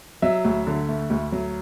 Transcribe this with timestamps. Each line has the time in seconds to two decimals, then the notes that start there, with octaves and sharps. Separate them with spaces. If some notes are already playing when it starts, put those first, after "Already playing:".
0.22 F#3 E5
0.45 D2
0.67 D3
0.89 A3
1.10 D2
1.32 F#3